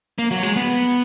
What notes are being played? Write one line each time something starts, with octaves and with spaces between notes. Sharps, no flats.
A#3
F#3
G#3
B3